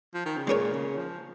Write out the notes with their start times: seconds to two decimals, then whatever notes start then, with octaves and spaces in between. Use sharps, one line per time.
0.14 F3
0.26 D#3
0.37 C#3
0.47 A#2 G#3 C#4 A#4 C#5
0.72 C#3
0.97 F3